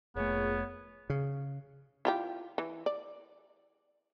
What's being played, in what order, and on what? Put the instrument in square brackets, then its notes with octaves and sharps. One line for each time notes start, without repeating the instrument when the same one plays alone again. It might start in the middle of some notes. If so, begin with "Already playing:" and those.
[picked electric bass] F1 A3 [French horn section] A#2 G#4 [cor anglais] B3 [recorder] C#5
[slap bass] C#3
[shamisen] E4 F4 G4
E3
D5